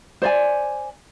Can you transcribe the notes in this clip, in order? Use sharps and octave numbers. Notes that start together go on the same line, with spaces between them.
C5 D5 G#5